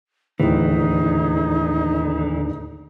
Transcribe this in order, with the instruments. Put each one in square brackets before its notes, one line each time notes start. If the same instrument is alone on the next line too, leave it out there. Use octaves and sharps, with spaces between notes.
[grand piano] D1 [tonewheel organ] D#2 D3 [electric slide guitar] E3 [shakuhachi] D#4